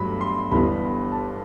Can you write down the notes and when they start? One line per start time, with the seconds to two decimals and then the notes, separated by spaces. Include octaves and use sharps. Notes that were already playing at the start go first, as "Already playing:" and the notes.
Already playing: G1 G2 F#3 A3 B5
0.21 C6
0.51 G1 G2 E3 G3 B3 B5
1.12 A5